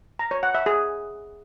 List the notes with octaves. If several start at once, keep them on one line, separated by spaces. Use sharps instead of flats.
A#5
C#5
F#5
E5
G#4